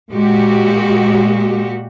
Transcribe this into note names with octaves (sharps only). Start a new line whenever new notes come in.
A#2 G#3 F#4 G4